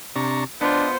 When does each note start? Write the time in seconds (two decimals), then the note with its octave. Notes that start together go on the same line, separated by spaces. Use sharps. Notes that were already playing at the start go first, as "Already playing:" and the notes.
0.16 C3 D4 A#5 C#6
0.61 B3 D4 F4 C5 D#5